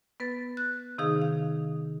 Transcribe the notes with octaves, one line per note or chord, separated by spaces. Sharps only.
B3 B4 A6
F#6
C3 D#3 D#4 G#4 F5 D#6
F5